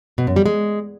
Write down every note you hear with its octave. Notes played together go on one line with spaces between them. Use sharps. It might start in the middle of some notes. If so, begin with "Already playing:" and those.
B2
F#2
G3
G#3